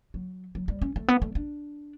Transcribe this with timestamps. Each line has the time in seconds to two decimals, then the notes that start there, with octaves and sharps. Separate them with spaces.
0.14 F#3
0.55 F#3
0.68 G3
0.82 C#4
0.96 A3
1.08 B3
1.22 A3
1.35 D4